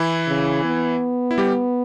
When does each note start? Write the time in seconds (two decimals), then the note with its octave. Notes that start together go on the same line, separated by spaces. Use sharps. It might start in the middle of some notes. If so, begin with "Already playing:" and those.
Already playing: E3 E4
0.27 C#3
0.64 B3
1.31 E4
1.38 G3 G4